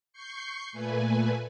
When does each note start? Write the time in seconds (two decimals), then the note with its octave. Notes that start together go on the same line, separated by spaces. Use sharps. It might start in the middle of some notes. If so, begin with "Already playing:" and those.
0.13 C#6 G6 C7 C#7
0.72 A#2 A3 B4 G#5